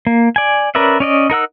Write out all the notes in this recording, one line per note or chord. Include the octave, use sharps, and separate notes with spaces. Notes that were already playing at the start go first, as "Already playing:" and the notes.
A#3
D5 G#5
C#4 A#4 B4 D5 E5
C#4 D5 D#5
D#4 A#4 F#5 E6